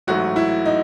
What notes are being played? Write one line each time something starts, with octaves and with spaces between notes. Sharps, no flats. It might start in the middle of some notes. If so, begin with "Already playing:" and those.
A1 G#2 F#3 A3 F#4
E4
D#4